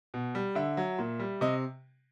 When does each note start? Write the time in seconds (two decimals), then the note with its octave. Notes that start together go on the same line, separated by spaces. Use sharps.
0.14 B2
0.35 G3
0.55 D3 E5
0.77 F#3
0.99 A#2
1.20 G3
1.41 C3 D#5